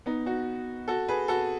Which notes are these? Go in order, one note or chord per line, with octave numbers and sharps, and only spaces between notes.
B3 D#4
D#4 F#4
F#4 A4
G#4 B4
F#4 A4